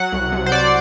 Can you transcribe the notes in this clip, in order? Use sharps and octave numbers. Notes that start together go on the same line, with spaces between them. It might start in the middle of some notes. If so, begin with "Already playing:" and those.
Already playing: F#3 F#5
C2
C2
C5
F#3 D5